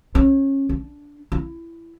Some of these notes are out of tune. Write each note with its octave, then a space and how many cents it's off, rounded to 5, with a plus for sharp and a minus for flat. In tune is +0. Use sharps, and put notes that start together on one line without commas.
C#4 -25
D4 -15
E4 +20